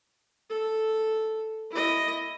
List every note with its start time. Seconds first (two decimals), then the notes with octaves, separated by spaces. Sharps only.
0.50 A4
1.71 E4 D#5